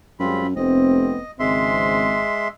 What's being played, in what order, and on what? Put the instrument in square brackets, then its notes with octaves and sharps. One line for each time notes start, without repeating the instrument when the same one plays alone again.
[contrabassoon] F#2 [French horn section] G3 G#3 C#4 [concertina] C4 F4 B5
[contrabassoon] F1 [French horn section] A3 B3 C4 [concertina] D#5
[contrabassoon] G#1 [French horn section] C#3 C4 [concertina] G#3 E5 C6